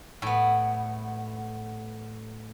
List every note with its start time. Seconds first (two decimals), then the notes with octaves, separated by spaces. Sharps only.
0.22 A2 B3